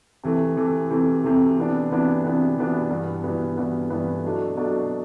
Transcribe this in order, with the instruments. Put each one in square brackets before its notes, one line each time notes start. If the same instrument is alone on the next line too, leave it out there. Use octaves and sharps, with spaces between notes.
[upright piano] C3 E3 A3
C3 E3 A3
C3 E3 A3
C3 E3 A3
C3 E3 B3 D4
C3 E3 B3 D4
C3 E3 B3 D4
C3 E3 B3 D4
G2 E3 B3
G2 E3 B3
G2 E3 B3
G2 E3 B3
B2 F#3 A3 D4
B2 F#3 A3 D4